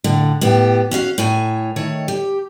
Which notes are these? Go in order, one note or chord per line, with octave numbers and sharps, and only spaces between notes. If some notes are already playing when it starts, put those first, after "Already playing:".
A2 D3
A2 B3 G4
C#4 F#4 E5 F5
A2 C#5 G#5
D#3 A3 C#5
G4